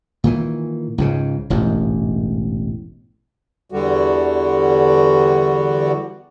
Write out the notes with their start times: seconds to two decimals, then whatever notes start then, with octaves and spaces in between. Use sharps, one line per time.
0.24 A#2 D#3 E3
0.98 C#2 G#2 C#3
1.50 E1 A1 G#2
3.72 E2 D3 G3 F#4